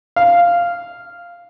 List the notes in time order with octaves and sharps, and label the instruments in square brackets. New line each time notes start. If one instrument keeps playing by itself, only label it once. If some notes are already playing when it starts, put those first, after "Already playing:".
[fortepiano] F5